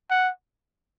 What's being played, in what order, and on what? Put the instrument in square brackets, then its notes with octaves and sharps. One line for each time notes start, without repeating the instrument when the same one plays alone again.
[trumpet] F#5